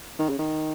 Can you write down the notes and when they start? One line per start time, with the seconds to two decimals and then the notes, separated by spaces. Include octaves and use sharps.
0.19 D#3
0.29 C#3
0.39 D#3